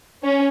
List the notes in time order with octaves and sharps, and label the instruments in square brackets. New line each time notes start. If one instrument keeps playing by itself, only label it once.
[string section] C#4